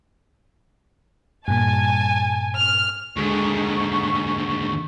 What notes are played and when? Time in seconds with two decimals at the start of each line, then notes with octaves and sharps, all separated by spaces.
1.48 G2 A#2 G#5 A5
2.58 F6
3.17 D#2 G#2 D3 C#6